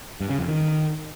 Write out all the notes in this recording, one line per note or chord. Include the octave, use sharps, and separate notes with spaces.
G2
C#3
F2
D#3